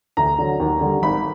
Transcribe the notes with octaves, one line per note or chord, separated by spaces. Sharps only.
D2 A#5
D3 F#3
D#2
D3 G3
G#1 B5